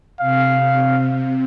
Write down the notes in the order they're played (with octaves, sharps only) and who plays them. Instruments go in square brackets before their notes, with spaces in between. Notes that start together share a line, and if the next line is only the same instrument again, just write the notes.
[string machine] C3 [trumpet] F5